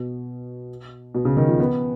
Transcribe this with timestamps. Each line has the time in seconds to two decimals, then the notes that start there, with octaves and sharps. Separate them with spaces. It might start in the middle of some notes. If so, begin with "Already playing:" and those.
Already playing: B2
1.15 B2
1.25 C#3
1.37 D#3
1.48 F3
1.60 B3